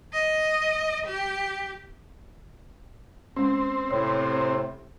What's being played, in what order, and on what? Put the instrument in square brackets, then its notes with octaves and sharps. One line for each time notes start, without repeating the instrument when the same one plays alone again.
[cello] D#5
G4
[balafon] G#3 C#4 [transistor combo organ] C4
[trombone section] A2 C3 [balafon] C#5